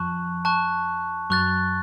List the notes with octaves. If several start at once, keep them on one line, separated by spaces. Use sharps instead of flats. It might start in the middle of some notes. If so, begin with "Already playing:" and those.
Already playing: F2 F3 A5 C#6 F#6
A5 C#6 F#6
F#2 F#3 C#6 F#6 A6